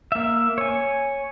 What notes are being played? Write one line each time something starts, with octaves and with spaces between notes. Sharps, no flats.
A#3 E5
C#5 G#5